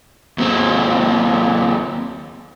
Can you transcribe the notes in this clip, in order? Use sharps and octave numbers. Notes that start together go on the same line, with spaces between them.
D#2 C4